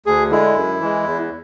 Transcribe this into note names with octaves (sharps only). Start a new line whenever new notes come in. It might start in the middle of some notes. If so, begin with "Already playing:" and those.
D2 G#4
D3 G#3 E4
F#2
E3 G#3
E2